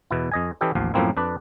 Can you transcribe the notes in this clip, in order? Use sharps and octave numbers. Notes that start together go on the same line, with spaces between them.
E2 B2 E4
F2 D#5 G#5
E3 C#4 E4 G4 A4 D#5
A1 D#2 F3 F5
F#2 A2 F3 A#3 C4 E4
F2 D4 B4 D5